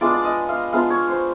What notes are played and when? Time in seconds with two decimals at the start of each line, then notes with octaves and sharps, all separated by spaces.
0.01 G#3 B3 D4 F4 D5
0.14 D5
0.25 D#5
0.49 F5
0.73 G#3 B3 D4 F4 F5
0.90 C#5
1.09 C5